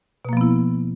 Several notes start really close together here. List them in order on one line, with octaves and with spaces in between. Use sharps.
B2 A#3 F3 B3 E4